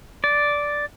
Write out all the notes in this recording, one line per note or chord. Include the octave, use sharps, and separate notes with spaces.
D5